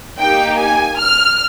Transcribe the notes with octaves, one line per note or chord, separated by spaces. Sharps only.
A#3 D#4 G4 G5
G#5
F6